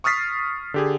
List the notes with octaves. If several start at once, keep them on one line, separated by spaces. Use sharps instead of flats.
C#6 D#6 F6 A6 B6 C7
D3 G4 G#4